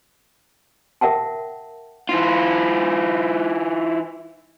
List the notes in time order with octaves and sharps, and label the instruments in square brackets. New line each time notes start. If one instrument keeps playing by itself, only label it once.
[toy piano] A#4 E5 F#5 G5 A5
[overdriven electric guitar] E3 F4